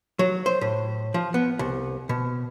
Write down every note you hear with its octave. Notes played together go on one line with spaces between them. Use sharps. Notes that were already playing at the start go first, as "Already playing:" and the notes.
F#3
C5
A2
F3
B3
C2
B2